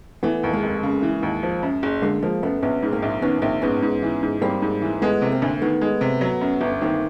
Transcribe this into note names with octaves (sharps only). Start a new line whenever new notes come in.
E3 A3 B3
D#2
G#3 A#3
F1
C#3
E3
D#2
F3
F#2
F#1
D3 G#3 A#3
F3 G#3 A#3
F#2 A3 B3
A#1 B3 C#4
G#2
A#3 C4
A#1
D#3 B3 C#4
A#1 A#3 C4
G#2 B3 C#4
G#2
E3
G#2
G3 A#3 C4
G#2
E3
G#3 A3 B3
C3
A#3 C4
D2
D#3 A3 B3
G#3
C3
F#3
F#2
G1
D#3 A#3 C4